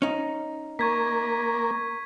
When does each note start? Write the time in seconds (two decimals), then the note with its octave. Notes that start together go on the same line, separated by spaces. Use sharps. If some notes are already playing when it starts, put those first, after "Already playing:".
0.02 C#4 D#4
0.79 A#3 C#6 G#6 B6